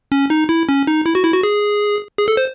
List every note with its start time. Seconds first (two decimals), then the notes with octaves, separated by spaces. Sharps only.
0.12 C#4
0.30 D#4
0.49 E4
0.69 C#4
0.87 D#4
1.06 E4
1.15 F#4
1.25 E4
1.34 F#4
1.43 G#4
2.18 G#4
2.28 A4
2.37 C5